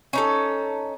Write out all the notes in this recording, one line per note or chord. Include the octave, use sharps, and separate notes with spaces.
C#4 D#4 A4